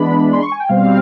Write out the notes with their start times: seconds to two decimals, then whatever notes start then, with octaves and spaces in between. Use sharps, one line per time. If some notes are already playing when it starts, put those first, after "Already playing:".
Already playing: E3 G#3 B3 D4 B5
0.33 C6
0.43 C#6
0.52 G#5
0.60 G5
0.69 B2 G3 C4 F5